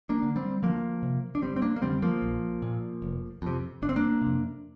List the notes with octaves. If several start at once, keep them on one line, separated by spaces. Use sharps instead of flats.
A#3 D4
D3
G3 C4
D2 F3 A#3
C3
D4
G1 G3 C4
C4
A#3 D4
A#3
F2 D3 G3 C4
F3 A#3
A#1
A#2
F1
F2 C3
G1 D4
C4
A#3 D4
C3
F2